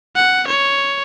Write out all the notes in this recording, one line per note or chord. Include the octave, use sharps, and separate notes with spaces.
F#5
C#5